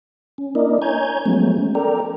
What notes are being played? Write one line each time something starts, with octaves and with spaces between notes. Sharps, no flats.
C#4
A#3 D4 E4 A#4 D5 D#5
C#5 G#5 A#5 G6 G#6
F3 F#3 G#3 A3 B3 C#4
A4 A#4 D5 G5 A#5